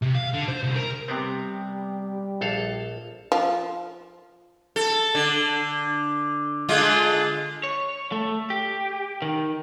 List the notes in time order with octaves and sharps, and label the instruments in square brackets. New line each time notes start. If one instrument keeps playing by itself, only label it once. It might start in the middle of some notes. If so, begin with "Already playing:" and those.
[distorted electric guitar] C3
F5
D3
C5
C2
A#4
[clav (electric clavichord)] C3 B3 C4 [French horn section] G3 G4
[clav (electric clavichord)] A#1 A4 F5
[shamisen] F3
[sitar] A4
D3
D3 G#3 F4
[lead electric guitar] C#5
A3
G4
D#3